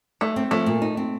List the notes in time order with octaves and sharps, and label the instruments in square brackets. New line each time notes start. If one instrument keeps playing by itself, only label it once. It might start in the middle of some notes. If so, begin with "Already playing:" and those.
[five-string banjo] A3 [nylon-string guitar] D#4
[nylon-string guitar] C4
[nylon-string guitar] F3 [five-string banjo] A3
[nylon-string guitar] A#2
D#4
C4